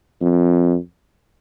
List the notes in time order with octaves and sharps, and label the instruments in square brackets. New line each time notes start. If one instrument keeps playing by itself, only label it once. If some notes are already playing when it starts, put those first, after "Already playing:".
[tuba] F2